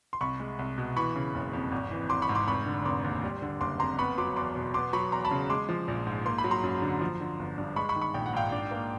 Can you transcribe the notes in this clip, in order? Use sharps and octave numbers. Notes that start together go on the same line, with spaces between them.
C6
C2 B5 C#6
G#3
C2
B2
E3 B5 C#6
C#3
F#1
F2
G#1
E3
G#1 C6 D6
B5 C#6
G#2
C6 D6
F1 B5 C#6
D3
F1 C6 D6
D#2
G3
D3
F#1 C6 D6
F2 A#5 C6
B3 B5 C#6
F#3 C6 D6
E2 C6 D6
B2
B3 C6 D6
F#3 B5 C#6
E2 A#5 C6
A5 B5
C#3
G#3 C6 D6
F3
A#1
G#2
A#3 C6
B5
F#3
A#5 C6
F#2
D3
F3
D3
G1
G2
G#3 B5 C#6
B5 C#6
D#3
B5 C#6
A#1 G5
F#5
G#2 F5 G5
D4
A#3